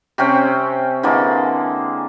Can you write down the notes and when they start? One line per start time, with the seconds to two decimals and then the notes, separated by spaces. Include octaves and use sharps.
0.18 C3 C4 C#4 G5
1.03 D3 E3 G#3 A#3